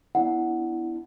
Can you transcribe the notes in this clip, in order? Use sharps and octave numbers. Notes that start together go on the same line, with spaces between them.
B3 D4 E4 F#5